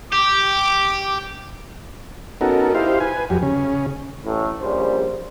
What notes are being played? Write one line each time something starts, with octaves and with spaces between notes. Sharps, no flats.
G4 D6
B3 C#4 D#4 F#4 A4 A#4
D#4 E4 G4 C5 F5
B4 G#5
F2 F#3 G4
C#3 C#4
A1 A2
A#1 C#3 G3 C5